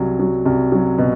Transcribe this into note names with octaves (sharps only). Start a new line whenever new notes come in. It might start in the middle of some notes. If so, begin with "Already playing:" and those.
Already playing: C2 F#3
F#3
C2
F#3
B2